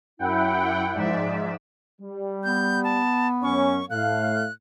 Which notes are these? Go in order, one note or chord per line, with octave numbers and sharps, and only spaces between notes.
F#2 E4 F#5 G5
G#2 F3 D5 E5
G3
B3 G6
A5
F#2 C#4 C#6
A2 A3 F5 F#6